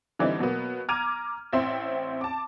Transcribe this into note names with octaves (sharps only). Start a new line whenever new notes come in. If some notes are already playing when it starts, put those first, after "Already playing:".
D3 E3 G3 C4 D#4
B2 F#3 A#3 B3
A#5 D6 F6 G#6 D#7 F7
A1 C4 E5 G5 C6
A5 D6